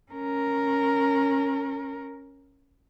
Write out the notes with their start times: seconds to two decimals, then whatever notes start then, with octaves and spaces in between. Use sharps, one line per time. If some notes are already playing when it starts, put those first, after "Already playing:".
0.12 C#4 A#4